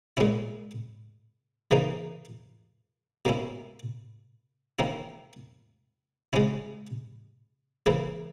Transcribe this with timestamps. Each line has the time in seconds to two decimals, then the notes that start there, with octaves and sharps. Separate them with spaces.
0.17 A#2 G#3 C#4 E4
1.71 C#3 E3 A#3 D#4
3.25 B2 A#3 C#4 E4
4.79 D#3 A#3 C#4 E4
6.33 C#3 G#3 C#4 E4
7.86 C#3 E3 A#3 E4